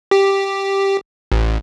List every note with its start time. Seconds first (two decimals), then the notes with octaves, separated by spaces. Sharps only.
0.11 G4
1.32 A1